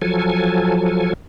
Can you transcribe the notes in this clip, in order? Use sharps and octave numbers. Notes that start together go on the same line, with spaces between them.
F3 F#3 A4 G#5